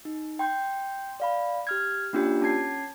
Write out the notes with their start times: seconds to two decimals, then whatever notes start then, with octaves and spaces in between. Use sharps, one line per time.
0.05 D#4
0.39 G5 C6 G6
1.20 D5 F5 B5
1.67 G4 F6 G#6
2.13 A#3 C#4 D4 F4 G4
2.42 C#4 A5 G#6 C7